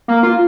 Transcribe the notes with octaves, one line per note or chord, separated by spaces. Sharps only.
A#3
F4